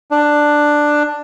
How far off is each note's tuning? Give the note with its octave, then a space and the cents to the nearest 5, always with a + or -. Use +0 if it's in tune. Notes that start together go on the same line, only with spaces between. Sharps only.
D4 +10